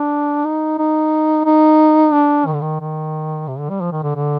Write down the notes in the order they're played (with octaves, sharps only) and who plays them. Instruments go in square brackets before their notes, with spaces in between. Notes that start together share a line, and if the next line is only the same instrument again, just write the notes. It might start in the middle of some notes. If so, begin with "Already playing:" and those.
Already playing: [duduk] D4
D#4
D#4
D#4
D4
D#3
D3
D#3
D#3
C3
D3
G3
F3
D#3
D3
D3